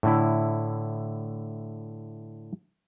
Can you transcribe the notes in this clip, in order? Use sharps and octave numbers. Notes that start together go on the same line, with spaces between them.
A2 D3 E4